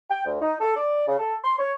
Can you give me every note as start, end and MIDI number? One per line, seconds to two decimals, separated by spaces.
0.09 0.23 79
0.26 0.38 38
0.41 0.55 63
0.60 0.74 69
0.76 1.02 74
1.08 1.18 49
1.19 1.35 69
1.43 1.59 84
1.59 1.73 73